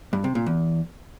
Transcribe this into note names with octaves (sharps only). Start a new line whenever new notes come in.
G2
C3
A#2
E2